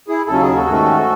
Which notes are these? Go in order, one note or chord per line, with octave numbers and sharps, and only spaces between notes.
E4 G#4
D#2 C#3 F#3 C#4 A4
G#4
F#4 A4
G#2 D#3 A3 C#4